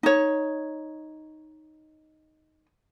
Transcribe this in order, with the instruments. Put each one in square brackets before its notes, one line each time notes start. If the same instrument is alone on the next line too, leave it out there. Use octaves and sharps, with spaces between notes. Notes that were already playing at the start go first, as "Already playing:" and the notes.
[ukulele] D#4 C#5